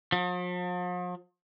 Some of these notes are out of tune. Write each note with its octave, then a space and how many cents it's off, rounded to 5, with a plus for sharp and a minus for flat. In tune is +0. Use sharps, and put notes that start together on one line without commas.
F3 +45